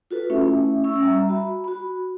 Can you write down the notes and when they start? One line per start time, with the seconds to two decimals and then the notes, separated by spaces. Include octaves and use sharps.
0.11 F4 F#4 A4 B4
0.30 A3 C#4 E4 E5
0.84 C#4 C#6 E6
1.03 G3 E5 A#5
1.29 F#4 B5
1.64 F#4 B5